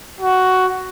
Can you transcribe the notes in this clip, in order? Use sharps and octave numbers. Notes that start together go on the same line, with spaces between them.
F#4